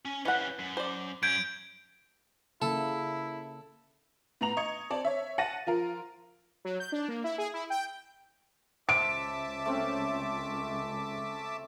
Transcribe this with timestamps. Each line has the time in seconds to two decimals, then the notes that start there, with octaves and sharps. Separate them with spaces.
0.06 C#4 G#5
0.25 E3 C#4 G4 F#5
0.59 F#2
0.77 C5 D5
1.23 F#2 C#4 G6 G#6 D7
2.62 C#3 A#3 E4 A4
4.41 A2 B3 A#5 F7
4.57 D#5 C#6 G#6 C#7
4.90 C4 D5 A5
5.05 C#5 E5
5.38 F#5 A5 A6 A#6 D#7
5.67 F3 F4 A#4
6.65 F#3
6.80 G6
6.92 D4
7.08 A#3
7.24 E4
7.38 G#4
7.54 E4
7.70 G5
8.89 C#2 C5 E5 A5 D6 D7
9.66 A3 C4 C#4